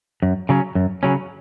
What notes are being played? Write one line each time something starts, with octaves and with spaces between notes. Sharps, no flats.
F#2
C#3 F#3 C#4
F#2
C#3 F#3 C#4